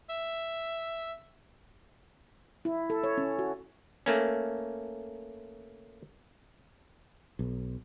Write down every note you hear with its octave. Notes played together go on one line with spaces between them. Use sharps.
E5
E4
A4
C#5
C#4
F#4
A3 A#3 C#4
B1